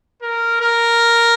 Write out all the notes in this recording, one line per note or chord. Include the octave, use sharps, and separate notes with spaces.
A#4
A#4